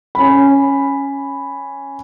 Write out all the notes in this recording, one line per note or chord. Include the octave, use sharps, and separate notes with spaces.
C#4 B5